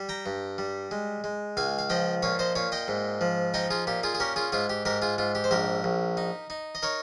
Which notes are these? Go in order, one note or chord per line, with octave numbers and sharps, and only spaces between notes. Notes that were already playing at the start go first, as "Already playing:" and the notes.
Already playing: G3
G5 A#5
G2
G3
G#3
G#3
C#2 F5 G#5
F5
F3 D#5 G5
A#2 C#5 F5
C5 D#5
A#2 C#5 F5
D#5 G5
G#2
F3
D#4 D#5 G5
F4 G#4
A#2 G4
F4 G#4
G#4
C#4 G4 A#4
F4 G#4
G#2 F4 G#4
G4
G#2 G4 A#4
F4 G#4
G#2 F4
G4
C5
A#1 G4 A#4
A#1
D#4
D#4
D#5
D#4 A#4 C#5